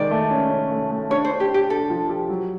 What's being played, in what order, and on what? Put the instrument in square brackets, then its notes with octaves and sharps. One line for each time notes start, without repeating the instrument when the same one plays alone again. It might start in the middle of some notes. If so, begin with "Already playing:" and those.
Already playing: [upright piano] D#3 G#3 [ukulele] D5
[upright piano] A3
C#4
C#4
A3
A3
[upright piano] D4 [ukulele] C#5
[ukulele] C5
[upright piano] D4
[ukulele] G4
[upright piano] D4
[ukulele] G4
[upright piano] D4 [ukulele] A4
[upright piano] F3
G4
F#3